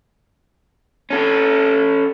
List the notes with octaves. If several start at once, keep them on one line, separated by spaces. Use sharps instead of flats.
C#4 A4